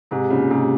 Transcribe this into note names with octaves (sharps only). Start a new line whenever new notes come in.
G#2 C3
A#2 C#3
G#2 C3